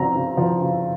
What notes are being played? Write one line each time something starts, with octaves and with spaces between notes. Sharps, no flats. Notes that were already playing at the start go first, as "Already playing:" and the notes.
Already playing: C#3 F3 C4 A#5
C#3
F3
C#3